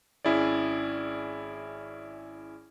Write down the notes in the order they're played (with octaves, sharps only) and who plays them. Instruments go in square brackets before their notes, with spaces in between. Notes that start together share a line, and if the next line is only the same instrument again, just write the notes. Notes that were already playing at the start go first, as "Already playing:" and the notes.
[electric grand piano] G#1 C#4 E4 G#4 D5